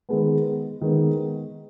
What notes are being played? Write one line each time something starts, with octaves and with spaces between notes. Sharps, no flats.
D#3 G#3 B3
D#3 G#3 B3